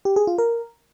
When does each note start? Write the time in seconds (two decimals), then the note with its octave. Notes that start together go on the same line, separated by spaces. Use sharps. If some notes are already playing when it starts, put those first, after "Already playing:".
0.05 G4
0.16 G#4
0.27 F4
0.38 A#4